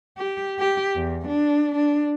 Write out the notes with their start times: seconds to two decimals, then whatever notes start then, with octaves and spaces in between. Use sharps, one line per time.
0.18 G4
0.59 G4
0.96 E2
1.27 D4
1.75 D4